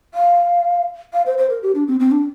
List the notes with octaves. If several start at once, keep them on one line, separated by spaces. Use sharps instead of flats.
F5
F5
C5
C5
A#4
G4
D4
C4
C4
D4